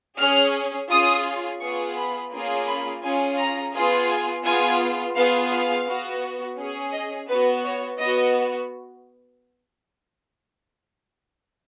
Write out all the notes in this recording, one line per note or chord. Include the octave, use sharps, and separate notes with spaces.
C#4 G#4 F6
C#4 F4 G#4 D#6
B3 F4 G#4 C#6
B5
A#3 C#4 F4 G#4
B5
C#4 F4 G#4 G#5
A#5
B3 F4 G#4
G#5
B3 F4 G#4 G#5
B3 F4 G#4 F5
F5
B3 F#4
C#4 G#4
D#5
B3 F#4 B4
C#5
B3 F#4 D#5